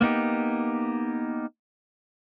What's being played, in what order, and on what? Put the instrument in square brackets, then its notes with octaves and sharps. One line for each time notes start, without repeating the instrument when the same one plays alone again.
[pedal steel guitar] A#3 B3 D#4 G4